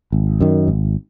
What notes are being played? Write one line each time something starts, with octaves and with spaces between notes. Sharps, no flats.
G#1
F#2 D#3
G#1